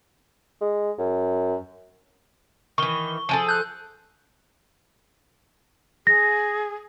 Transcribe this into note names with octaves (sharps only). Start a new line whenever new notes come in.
G#3
F#2
D#3 E3 C#6 G7
F3 G#4 A4
F#6 G6
G#4 A#6